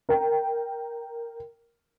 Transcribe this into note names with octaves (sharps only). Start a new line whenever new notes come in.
A#4 G5